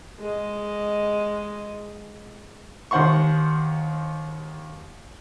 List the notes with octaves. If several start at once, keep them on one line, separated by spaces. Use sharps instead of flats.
G#3 D#5
D#2 D#3 C5 F#5 C6 C#6